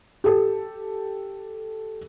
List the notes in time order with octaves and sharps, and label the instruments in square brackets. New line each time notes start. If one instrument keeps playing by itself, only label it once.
[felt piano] G4 A4